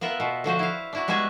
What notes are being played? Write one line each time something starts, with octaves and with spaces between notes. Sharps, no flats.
B3 F4 A#4 E5 F#5
B2
D3 F3 F#4 C5
E4 F5
D4 E4 F#4
G3 G#3 B3 F#4 G#4 E5